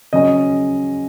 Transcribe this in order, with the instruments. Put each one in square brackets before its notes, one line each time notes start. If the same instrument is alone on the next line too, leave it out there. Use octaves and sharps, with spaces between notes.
[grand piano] C#3 F#3 C#4 D#5